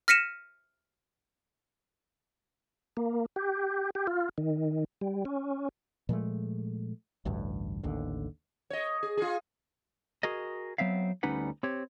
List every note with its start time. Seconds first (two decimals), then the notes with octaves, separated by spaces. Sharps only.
0.08 F6 A#6 B6 C#7 D#7 E7
2.97 A#3
3.36 G4
3.95 G4
4.07 F4
4.38 D#3
5.01 G3
5.25 C#4
6.09 A#2 F3 G#3 A3
7.25 A1 D2 G2
7.83 A1 D#2 D3
8.70 C#5 D#5
9.03 G#4
9.17 F4 G#4
10.23 F#4 G#4 A#4 D#5
10.78 F#3 B3 C4 E5 F5
11.23 D2 G3 C#4 D#4 B4 F#5
11.63 C4 G4 C#5